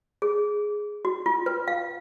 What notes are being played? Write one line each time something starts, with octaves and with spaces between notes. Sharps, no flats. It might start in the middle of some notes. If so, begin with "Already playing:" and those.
G#4
F#4
F4
B4
F5